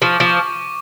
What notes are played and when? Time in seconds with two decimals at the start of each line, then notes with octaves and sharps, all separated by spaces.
0.02 F3 C#6
0.14 D6
0.20 F3
0.26 C#6